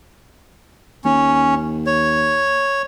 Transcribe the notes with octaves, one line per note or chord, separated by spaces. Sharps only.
D#2 C#4
C#5